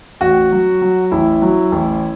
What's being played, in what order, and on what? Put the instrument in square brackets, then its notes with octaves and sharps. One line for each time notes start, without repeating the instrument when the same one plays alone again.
[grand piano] A1 F#4
F#3
F#3
A1 E4
F#3
A1